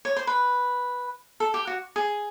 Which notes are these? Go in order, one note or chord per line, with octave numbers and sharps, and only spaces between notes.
C#5
C5
B4
A4
G4
F#4
G#4